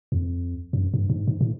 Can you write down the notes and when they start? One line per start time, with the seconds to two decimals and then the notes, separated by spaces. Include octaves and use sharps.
0.12 F2
0.73 F#2
0.94 G2
1.10 G2
1.13 G#2
1.27 G#2
1.41 A2